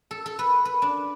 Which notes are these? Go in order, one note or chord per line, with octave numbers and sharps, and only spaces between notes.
A4
A4
B4
B4
D4